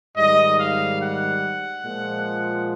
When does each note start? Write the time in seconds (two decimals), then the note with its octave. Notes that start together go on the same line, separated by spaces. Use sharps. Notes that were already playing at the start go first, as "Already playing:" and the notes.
0.17 G#2 D#3 G3 D#5
0.59 F5
1.01 F#5
1.84 A#2 F3 G#3